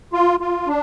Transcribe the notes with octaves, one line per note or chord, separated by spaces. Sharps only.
F4
F4
D4